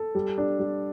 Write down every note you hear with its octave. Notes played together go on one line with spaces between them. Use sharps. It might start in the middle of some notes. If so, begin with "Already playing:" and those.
Already playing: A4
G3
D4
G3